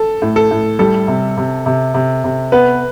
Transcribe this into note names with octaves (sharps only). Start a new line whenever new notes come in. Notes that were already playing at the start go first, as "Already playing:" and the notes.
Already playing: A4
A2
A4
A2
G3 A4
C3
C3
C3
C3
C3
B3 B4